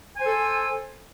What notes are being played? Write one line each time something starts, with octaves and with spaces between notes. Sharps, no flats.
A4 C5 G#5